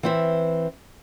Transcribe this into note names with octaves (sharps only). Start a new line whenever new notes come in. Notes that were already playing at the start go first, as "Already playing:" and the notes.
E3 C4 E5